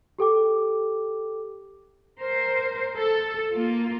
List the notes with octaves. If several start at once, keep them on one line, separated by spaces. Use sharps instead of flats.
G4 A4 G5 D6
A#4 C5
A4
A#3 F4